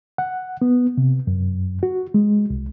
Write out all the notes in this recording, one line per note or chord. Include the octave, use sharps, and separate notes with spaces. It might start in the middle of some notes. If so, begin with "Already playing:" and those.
F#5
B3
C3
F#2
F#4
G#3
C2